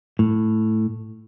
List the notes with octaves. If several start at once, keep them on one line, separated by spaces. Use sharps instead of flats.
A2